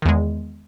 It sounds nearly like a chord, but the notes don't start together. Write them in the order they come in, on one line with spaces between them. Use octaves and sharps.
D#3 E2 G#3